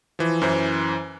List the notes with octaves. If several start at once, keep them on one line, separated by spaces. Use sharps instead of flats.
E3 F3
F#2 E3 C5